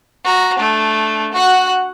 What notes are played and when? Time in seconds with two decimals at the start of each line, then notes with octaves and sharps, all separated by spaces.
0.24 F#4 A#5
0.58 A3 D4
1.32 F#4 F#5